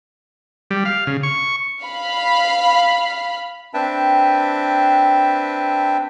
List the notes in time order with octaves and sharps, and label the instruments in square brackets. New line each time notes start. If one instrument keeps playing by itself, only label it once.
[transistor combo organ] G3
F5
C#3
C#6
[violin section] F5 B5
[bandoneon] C4 D4 B4 E5 G5 A5